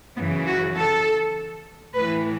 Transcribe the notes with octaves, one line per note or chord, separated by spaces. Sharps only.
F#2 C#3 E3 B3
F#4
A4
A2 E3 B4